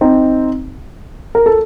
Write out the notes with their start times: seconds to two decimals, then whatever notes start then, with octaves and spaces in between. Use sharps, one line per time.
0.01 C4 D#4
1.35 A#4
1.46 A4